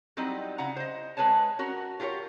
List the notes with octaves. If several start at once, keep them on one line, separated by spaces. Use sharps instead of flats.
F#3 G3 C4 D#4 E4 D#5
C#3 E4 F5 F#5 A#5
C5 D#5
G#3 D4 G#4 B4 C#5 A5
C#4 F#4 A#4
F4 G4 A#4 B4 C#5